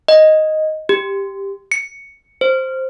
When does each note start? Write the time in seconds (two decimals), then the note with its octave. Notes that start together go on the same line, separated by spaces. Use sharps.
0.08 D#5
0.89 G4
1.72 C#7
2.41 C5